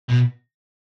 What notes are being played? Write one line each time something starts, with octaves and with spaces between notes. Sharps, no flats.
B2